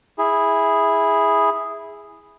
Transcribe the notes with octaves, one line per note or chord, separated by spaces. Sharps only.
E4 G#4